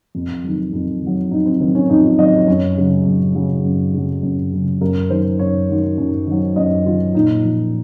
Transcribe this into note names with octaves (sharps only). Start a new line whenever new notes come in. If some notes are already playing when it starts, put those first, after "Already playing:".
F2
D#3 F#3
F2
D#3 F#3
F2 D#4
C4
D#3 F#3 C4
C#4
F2 D#4
F4
D#3 F#3 D#5
C#5
F#2 C#5
C#3 F#3
F#2
C#3 F#3
F#2
C#3 F#3
F#2
C#3 F#3
F#2 A#4
D#3 F#3 C5
F#2 C#5
D#3 F#3
F#2
D#3 F#3
F#2 D#5
D#3 F#3 F4
A#2 D#4
F3